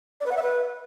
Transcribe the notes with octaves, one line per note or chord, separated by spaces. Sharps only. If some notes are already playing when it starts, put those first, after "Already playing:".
D5
B4
F#5
E5
B4